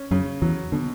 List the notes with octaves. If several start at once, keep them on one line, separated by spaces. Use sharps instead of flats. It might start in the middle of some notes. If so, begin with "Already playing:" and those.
Already playing: C#4
F#2 C#3 F#3
E2 E3 F#3
B2 D3